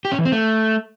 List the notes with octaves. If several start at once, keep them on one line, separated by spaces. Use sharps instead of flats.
G4
C#4
E3
C4
A3